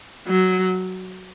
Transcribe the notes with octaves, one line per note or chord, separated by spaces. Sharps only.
F#3